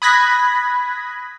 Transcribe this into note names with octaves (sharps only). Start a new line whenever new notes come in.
B5 D#6 F#6 G#6 A#6 B6